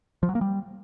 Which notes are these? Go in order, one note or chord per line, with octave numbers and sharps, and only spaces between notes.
F3
F#3
A#3
G3